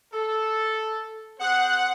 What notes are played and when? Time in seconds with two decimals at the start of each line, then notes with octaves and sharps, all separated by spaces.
0.13 A4
1.39 C4 G#4 C5 F#5